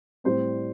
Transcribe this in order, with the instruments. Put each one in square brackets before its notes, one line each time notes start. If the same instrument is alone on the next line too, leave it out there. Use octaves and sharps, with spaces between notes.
[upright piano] A2 G3 C4 C5